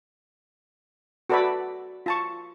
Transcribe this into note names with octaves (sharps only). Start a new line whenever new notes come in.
F#4 A4 B4 D5 E5 B5
F4 A5 C#6